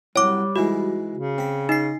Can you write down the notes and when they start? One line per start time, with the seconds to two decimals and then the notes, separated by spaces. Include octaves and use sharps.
0.16 C2 F#3 G3 C#5 D6
0.56 G#2 E3 G#3 F#4
1.13 C#3
1.38 C4 B5
1.69 D#4 D#5 C6 C7